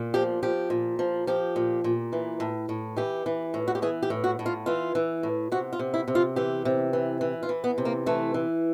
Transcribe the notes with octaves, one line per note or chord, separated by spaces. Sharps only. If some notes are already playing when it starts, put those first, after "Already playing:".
Already playing: A#2
F3 G4
F3 G4
A#2
F3
F3 G4
A#2
A#2
E3
A2
A2
E3 G4
E3
A2
F#4
G4
E3 G#4
G4
A2
F#4
A2
F4
E3 F4
E3
A2
C3 F#4
F4
C3
E4
C3
F4
E3 G4
C3
E3
E3
F4
E3
B3
C3
A#3
E3 A3
E3